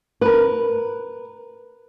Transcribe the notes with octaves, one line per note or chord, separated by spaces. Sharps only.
A#4 B4